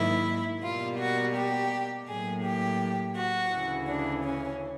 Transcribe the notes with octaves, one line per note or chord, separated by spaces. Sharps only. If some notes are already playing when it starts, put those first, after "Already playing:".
Already playing: G#2 D#3 F#3 A#3 E4
B2 G3 A#3 F4
F#4
G4
A2 F#3 A#3 G#4
G4
F#4
D2 C#3 E3
D4
C#4